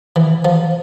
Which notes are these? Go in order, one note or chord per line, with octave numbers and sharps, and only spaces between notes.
E3
F3